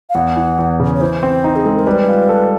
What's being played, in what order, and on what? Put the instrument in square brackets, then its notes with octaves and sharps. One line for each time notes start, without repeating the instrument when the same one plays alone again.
[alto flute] F5
[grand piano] E2 [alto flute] F#5
[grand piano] E3
E2
C#3
[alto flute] C#5
[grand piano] E3 [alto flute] C5
[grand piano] C4
D#4
[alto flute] G#4
[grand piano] G#3 [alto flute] A4
[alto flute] A#4
[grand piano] G3 [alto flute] B4
[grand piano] F4
A4